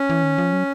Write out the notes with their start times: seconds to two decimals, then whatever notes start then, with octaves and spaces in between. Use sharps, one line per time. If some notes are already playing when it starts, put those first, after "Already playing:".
Already playing: C#4
0.10 E3
0.23 D#3
0.38 F3
0.53 F#3